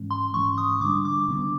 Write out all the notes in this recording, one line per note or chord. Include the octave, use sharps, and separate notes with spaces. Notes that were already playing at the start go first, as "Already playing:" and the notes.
Already playing: G#2 E3 G#3 C#4
C6
G#2 E3 G#3 C#4 C#6
D#6
D3 G3 B3 D4 D6
D6
D3 G3 B3 D4